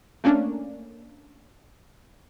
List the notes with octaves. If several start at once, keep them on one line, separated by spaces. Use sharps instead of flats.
A3 A#3 C#4 D4